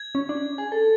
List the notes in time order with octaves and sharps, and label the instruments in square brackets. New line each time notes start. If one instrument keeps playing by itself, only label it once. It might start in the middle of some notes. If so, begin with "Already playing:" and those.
Already playing: [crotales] G#6
[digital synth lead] C#4
D4
G#4
A4